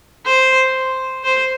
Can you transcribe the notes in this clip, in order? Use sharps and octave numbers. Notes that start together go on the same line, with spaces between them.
C5
C5